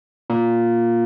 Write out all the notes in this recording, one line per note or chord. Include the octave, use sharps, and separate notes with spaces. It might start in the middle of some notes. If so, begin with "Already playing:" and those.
A#2